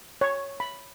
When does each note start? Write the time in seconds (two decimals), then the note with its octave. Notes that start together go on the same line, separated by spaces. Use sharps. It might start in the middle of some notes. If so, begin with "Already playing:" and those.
0.21 C#5
0.60 B5